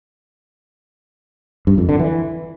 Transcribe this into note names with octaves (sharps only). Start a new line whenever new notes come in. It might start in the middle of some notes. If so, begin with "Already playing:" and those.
G2
F2
D3
E3